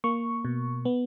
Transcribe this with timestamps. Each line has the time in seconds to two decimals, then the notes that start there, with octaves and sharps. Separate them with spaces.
0.04 A#3 C#6
0.45 B2
0.85 B3